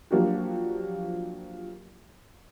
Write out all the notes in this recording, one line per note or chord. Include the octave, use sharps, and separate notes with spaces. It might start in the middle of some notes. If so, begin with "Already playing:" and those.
F3 F#3 A#3 D4 F#4 G4